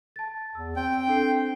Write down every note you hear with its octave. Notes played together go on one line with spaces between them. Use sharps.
A5 A6
E2 E6
C4 G5
D4 A4 C7